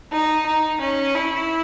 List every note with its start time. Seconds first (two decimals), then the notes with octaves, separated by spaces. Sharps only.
0.11 D#4
0.46 D#4
0.80 C#4
1.14 E4